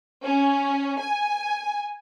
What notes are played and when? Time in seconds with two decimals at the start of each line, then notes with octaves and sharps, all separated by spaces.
0.24 C#4
1.00 G#5